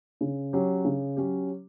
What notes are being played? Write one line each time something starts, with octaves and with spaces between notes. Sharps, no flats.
C#3
F#3 C#4 G4
C#3
F#3 C#4 G4